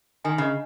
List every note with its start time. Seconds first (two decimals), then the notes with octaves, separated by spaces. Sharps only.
0.24 D#3 G#5
0.38 C#3 D#5